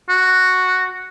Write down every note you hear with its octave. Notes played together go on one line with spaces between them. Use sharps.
F#4